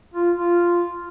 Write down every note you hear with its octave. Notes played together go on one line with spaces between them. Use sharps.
F4
F4